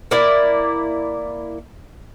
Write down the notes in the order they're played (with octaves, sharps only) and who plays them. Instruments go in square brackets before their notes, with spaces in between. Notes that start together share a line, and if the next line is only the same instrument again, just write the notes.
[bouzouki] A#3 E4 D5